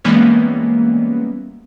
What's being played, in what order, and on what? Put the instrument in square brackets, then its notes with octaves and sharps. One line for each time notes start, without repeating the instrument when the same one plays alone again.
[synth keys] E3 G3 G#3 A#3 B3 C#4